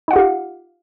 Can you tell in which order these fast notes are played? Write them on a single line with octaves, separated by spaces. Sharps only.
D#4 F#5 F4 G4 F5